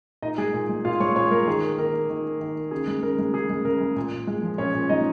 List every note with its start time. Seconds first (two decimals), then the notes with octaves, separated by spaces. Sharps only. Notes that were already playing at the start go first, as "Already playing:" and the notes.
0.22 A#2 D#4 D#5
0.38 G#3 G#4 G#5
0.54 A#2
0.69 G#3
0.85 A#2 F4 F5
1.00 G#3 C#5 C#6
1.16 A#2 C#5 C#6
1.31 G#3 A#4
1.47 D#3 G#4
1.63 A#3
1.78 D#3 A#4
1.94 A#3
2.09 D#3
2.25 A#3
2.40 D#3
2.56 A#3
2.71 C#3 G#4
2.87 G#3
3.03 C#3 A#4
3.19 G#3
3.34 C#3 G#4
3.50 G#3
3.65 C#3 A#4
3.80 G#3
3.96 A#2
4.12 A#2
4.27 G#3
4.43 F3
4.58 A#2 C#4 C#5
4.74 A#2
4.89 G#3 D#4 D#5